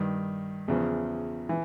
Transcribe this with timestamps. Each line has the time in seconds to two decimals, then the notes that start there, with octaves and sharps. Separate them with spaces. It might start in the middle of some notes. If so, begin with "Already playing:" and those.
Already playing: G2 D#3
0.68 E2 C#3 F3
1.49 E3